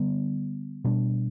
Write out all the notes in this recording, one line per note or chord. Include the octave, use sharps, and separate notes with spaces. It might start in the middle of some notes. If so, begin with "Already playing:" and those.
Already playing: D3 G3 B3
B2 G3 D4